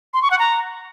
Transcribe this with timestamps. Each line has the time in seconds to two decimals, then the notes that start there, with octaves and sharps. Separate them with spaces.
0.14 C6
0.22 C#6
0.31 F#5
0.39 A#5